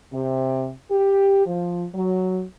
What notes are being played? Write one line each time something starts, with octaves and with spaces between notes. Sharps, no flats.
C3
G4
F3
F#3